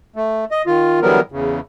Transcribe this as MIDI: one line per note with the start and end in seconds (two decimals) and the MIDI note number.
0.16 0.45 57
0.51 0.62 75
0.67 1.00 51
0.67 1.00 65
1.02 1.20 50
1.02 1.20 52
1.02 1.20 54
1.02 1.20 55
1.02 1.20 59
1.02 1.20 70
1.32 1.60 40
1.32 1.60 49